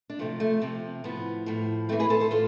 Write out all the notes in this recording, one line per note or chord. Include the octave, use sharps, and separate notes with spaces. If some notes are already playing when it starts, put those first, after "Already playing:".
D4
C3 F3 A3 C4
A3
C3 F3
A2 F3 B3
A2 F3
A2 E3 A3 C4
G#4 B4
A4 C5
A4 C5
A2 F4 A4